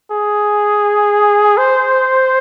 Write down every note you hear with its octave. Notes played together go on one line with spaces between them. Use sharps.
G#4
C5